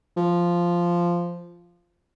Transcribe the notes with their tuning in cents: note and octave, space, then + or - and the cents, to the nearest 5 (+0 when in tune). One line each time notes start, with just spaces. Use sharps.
F3 -5